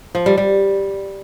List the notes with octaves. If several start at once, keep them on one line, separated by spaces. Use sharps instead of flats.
F3
G3
G3